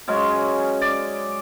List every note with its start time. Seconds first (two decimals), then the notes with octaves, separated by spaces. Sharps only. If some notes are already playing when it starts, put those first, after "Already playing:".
0.08 C#3 F#3 G#3 C#4
0.82 D5